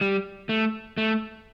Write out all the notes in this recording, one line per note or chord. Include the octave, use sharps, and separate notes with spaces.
G3
A3
A3